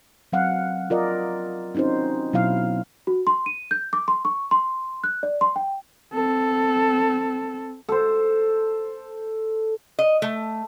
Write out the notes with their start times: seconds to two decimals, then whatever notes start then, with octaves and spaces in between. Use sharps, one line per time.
0.33 F#3 C4 F5 F#5
0.90 F4 A#4 D5 D#5
1.75 C4 C#4 D#4 F#4 C5
2.33 B2 F#3 B3 E4 F5
3.07 F#4
3.27 C6
3.46 D#7
3.71 G6
3.93 D6
4.08 C6
4.25 C#6
4.51 C6
5.04 F#6
5.23 D5
5.41 C6
5.56 G5
6.13 C4 A4
7.89 A4 C5
9.99 D#5
10.22 A3